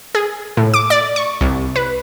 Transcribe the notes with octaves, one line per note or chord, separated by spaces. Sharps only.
G#4
A2
D6
D5
C#6
C2
B4